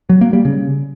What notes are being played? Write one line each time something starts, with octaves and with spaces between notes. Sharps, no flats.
F#3
A#3
G3
C#3